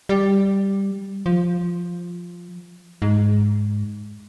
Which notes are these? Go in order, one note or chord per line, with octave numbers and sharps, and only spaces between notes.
G3
F3
G#2